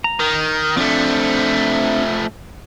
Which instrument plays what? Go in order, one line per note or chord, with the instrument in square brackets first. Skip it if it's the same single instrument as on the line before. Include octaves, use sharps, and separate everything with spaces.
[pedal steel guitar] A#5
[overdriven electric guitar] D#3
[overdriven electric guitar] F3 A3 [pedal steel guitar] C4 D4